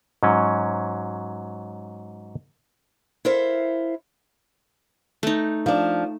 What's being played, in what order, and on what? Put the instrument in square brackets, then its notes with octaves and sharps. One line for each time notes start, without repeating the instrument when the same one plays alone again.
[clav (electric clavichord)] G#2 F#3 C#4
[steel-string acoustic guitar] E4 A4 A#4 C5 E5 F5
[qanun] A3 D#4
[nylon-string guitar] F3 D4